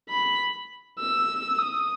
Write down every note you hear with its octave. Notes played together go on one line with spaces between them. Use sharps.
B5
E6
D#6